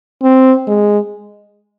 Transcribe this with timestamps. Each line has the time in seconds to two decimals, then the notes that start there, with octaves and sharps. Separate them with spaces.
0.23 C4
0.67 G#3